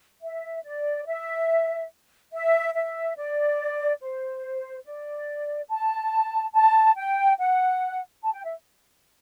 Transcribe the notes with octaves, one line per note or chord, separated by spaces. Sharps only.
E5
D5
E5
E5
E5
D5
C5
D5
A5
A5
G5
F#5
A5
G5
E5